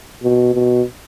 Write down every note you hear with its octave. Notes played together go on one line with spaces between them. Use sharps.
B2
B2